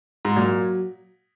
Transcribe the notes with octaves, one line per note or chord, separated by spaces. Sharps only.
G#2
A#2 F#3